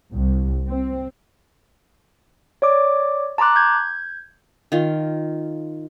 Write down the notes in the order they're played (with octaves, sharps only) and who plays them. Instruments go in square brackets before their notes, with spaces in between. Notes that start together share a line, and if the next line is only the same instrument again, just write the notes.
[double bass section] C2
C4
[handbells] C#5 D5 D6
A5 A#5 C6 D6 F#6
G6 G#6
[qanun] D#3 F4